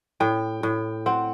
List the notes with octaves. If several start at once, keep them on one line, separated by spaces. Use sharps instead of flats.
A2 G5
A2
C4 F#5